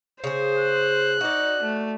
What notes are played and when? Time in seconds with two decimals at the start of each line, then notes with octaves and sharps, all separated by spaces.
0.24 C#3 G#4 C5
0.59 F#6
1.21 D#4 F#4 D5
1.63 A3